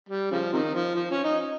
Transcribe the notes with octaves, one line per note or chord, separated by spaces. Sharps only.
G3
C#3 F3
C3 D#3
F3
F3
C#4
D#4